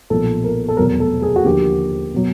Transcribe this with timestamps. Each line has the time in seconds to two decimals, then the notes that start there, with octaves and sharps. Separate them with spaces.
0.10 B1 A#2 F3 A4
0.44 A#4
0.69 A4
0.77 F1 E2 B2 F#3 A#4
1.00 A4
1.22 G#4
1.36 F#4
1.44 D#2 D3 F3 G4
2.14 B2 F#3